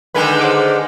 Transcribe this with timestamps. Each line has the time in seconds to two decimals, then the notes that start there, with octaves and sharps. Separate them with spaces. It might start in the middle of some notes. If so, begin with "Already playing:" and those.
0.14 D3 D#3 G#3 B4 G#5
0.40 C5 F#5 D6